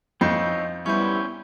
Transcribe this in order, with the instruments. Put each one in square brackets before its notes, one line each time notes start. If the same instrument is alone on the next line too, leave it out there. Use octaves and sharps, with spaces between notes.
[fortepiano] F2 [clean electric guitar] C4 D#4 C#5 [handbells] D#5 G6 C7
[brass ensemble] G3 B3 E4 [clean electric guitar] C#4 C5 [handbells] C#6 G6